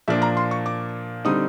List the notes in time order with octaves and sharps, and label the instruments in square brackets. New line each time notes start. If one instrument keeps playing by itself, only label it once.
[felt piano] A#2 F3 A#3 D4 E5
A#5
C6
C#6
D6
D3 G3 C4 D#4 D#6